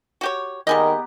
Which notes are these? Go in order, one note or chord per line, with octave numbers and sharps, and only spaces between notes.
F#4 G4 C#5
D#3 G3 B3 G4 G#4 A#4 D#5